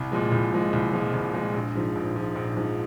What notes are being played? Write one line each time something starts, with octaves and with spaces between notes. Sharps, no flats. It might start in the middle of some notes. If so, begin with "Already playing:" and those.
Already playing: C2
A#2 F3 G#3
C2
A#2 F3 G#3
C2
A#2 F3 G#3
C2
A#2 F3 G#3
A#1
G#2 F3
A#1
G#2 F3
A#1
G#2 F3